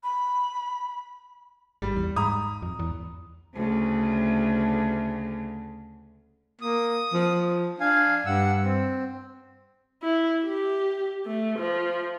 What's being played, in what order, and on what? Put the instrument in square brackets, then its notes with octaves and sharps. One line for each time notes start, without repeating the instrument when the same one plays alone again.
[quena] B5
[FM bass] G#1 [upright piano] G3
[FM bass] E2
[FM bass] G#2 [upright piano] A#5 B5 D#6
[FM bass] F2
E2
[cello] D2 C#3
[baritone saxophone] A#3 [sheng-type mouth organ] D#6
[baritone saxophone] F3
[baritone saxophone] D4 [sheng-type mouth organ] F5 G#5
[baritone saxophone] G2 [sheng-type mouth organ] F#5 E6
[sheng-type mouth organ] C4
[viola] E4
G4
A3
F3